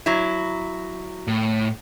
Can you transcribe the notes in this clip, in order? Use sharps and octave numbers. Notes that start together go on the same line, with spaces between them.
F#3 E4
A2